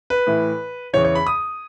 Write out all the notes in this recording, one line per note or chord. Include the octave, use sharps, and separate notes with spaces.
B4
A2 E3
E2 C#3 E3 C#5
C#5
B5
D#6